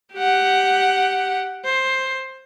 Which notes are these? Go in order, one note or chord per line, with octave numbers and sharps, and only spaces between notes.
G4 F#5
C5